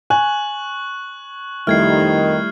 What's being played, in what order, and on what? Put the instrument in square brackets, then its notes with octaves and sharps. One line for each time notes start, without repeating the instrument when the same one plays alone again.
[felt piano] G#5 [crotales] C#6 F#6 F#7
[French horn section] F2 D#3 [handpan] G3 A3 E4 [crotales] F6 G#6 C7